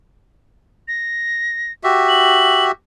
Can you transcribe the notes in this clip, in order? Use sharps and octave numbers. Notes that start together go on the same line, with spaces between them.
A#6
F#4 G4 E5
F#7